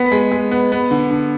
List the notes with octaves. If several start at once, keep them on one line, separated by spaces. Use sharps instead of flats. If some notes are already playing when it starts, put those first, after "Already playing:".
Already playing: B3 B6
G#3
G#3
B3
B3
D3
D3